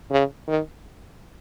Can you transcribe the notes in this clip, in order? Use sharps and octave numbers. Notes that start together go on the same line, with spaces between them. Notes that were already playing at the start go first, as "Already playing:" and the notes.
C#3
D#3